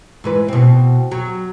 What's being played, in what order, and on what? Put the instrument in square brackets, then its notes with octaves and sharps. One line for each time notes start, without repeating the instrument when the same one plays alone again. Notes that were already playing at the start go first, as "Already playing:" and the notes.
[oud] G#2 E3 B4
B2 C4
F#3